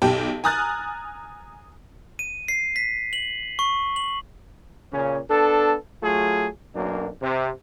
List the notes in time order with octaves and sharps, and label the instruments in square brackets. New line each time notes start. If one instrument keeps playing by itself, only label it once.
[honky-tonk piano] B1 G4 G5 A5
G#5 A#5 D#6 F6 F#6 A6
[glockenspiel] D#7
C7
B6
F#7
C#6
F#7
[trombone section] A#2 C#3 C#4
B3 D4 A4
F#3 A3 F4 G#4
B1 F#2 A#3 D4
C3